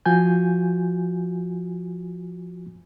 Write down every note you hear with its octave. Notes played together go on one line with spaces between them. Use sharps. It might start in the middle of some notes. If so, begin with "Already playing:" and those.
F3 F4 F#4 G#5 G6